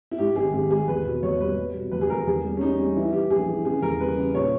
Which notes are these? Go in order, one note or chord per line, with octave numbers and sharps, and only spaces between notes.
E4
G#2 G4
G#1 G#4
G#1 G4
G#2 G#4
E2 B4
B2
E2 C#5
G3 B4
G3
B2
E2 B4
G#4
E2 A#4
E2 G#4
G3
C#4
G3 D#4
G3
E3 E4
E3 G4
A#1 G#4
E3
C#3 G#4
E2 A#4
G3 B4
C#3
A#2 C#5